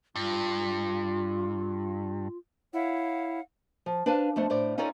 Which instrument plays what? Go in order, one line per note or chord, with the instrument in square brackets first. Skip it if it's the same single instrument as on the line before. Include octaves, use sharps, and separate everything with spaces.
[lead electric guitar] G2 [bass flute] F4
[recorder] E4 [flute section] C#5 F5 F#5
[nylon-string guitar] F3
D4 B4 C5 F5 G#5 A5
F2 A3 B3 C5
A2 C5 D5
C#4 D#4 F4 A4 C#5 D5